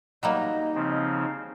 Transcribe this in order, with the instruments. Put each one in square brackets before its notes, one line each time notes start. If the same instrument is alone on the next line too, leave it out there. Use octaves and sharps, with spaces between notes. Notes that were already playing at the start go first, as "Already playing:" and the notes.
[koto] F#3 G3 A#3 [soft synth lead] D#4 [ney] D#5
[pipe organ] C#3 F3 C4